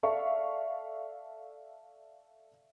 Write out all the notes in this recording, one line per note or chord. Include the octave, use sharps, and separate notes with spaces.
A4 D5 E5 F5 C#6